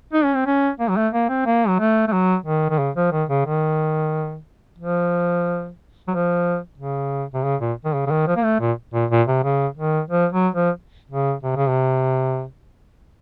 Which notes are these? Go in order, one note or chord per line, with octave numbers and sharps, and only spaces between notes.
D#4
C#4
C4
C#4
A#3
F#3
A3
A#3
C4
A#3
F#3
A3
A3
F#3
D#3
D#3
C#3
F3
D#3
C#3
D#3
F3
F#3
F3
C#3
C3
C#3
A#2
D#3
C#3
C#3
D#3
F3
A#3
A3
A#2
A#2
A#2
C3
C#3
D#3
F3
F#3
F3
C#3
C3
C#3
C3